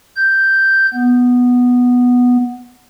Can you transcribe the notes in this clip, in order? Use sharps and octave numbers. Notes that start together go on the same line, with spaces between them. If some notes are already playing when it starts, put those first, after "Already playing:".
G6
B3